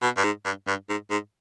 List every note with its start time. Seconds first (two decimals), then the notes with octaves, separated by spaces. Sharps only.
0.02 B2
0.17 G2
0.24 G#2
0.45 G2
0.67 G2
0.89 G#2
1.11 G#2